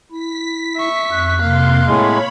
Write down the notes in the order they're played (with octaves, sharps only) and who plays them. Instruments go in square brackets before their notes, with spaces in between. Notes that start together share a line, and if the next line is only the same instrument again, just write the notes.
[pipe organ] E4 [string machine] B6
[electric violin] E5 C#6
[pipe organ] F2 F#6
[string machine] C3 C6 [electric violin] A#3 F5
[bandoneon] A2 G#3 [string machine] C#5 B5